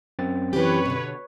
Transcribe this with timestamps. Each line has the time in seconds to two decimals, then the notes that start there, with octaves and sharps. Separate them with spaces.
0.19 F#2 C4 A6
0.53 E3 G4 B4 C#5
0.86 B2 D3